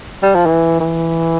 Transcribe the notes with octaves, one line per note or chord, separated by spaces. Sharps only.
G3
F3
E3
E3